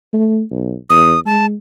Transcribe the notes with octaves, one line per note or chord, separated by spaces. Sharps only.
A3
B1
E2 D#6
G#3 A5